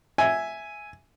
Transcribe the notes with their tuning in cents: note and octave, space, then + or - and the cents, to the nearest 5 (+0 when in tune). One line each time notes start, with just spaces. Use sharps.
E5 +0 G#5 +0